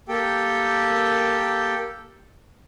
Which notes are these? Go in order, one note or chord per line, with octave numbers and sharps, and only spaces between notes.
A#3 G4 A4 G5